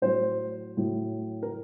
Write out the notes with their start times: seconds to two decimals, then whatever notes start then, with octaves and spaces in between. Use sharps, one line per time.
0.02 A2 F#3 C5
0.77 A2 F#3
1.43 A#4